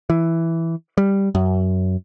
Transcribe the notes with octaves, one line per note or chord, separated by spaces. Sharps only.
E3
G3
F#2